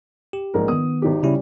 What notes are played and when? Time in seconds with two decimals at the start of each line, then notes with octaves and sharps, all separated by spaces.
0.33 G4
0.54 A#1 G#2 A#4
0.68 D#3 B3 D#6
1.02 G#1 D#4 G4
1.23 C#3 G3 C#4 E4